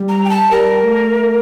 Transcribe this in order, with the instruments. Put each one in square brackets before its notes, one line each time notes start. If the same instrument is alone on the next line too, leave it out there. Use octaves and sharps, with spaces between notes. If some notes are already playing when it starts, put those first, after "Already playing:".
Already playing: [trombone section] G3
[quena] A#5
G5
A5
[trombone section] G3 [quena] A#4
[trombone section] A3